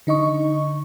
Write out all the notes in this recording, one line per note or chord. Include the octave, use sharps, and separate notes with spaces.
D3 D#4 D#5 C#6